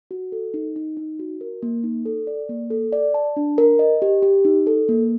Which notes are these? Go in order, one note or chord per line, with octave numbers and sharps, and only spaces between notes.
F#4
A4
D#4
D#4
D#4
F#4
A#4
A#3
D#4
A4
D5
A#3
A4
D5
A5
D4
A#4
D#5
G4
G4
D#4
A4
A#3